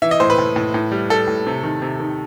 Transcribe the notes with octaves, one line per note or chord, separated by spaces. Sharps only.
E3 E5
D#5
A2 C5
B4
A2
A2
A2
G3
G3 A4
A2
C3
D#3
C3
D#3